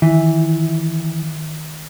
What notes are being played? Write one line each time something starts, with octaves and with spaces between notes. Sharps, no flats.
D#3 E3